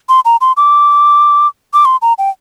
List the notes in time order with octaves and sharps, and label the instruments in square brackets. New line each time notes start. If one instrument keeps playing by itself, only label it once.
[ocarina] C6
A#5
C6
D6
D6
C6
A#5
G5